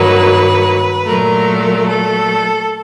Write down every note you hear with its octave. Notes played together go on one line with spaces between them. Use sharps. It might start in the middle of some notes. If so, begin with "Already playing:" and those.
Already playing: G2 D#3 F#3 A#3 B4
A#2 F#3 A3 A#4
A4